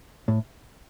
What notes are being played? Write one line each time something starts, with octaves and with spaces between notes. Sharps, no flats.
A2